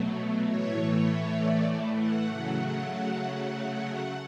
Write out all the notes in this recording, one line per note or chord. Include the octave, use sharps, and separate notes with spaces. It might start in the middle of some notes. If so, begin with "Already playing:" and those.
Already playing: B2 F#3 A3
A2 E3 A3 C#5
C#5
D5
F#5
C#3 F#3 A3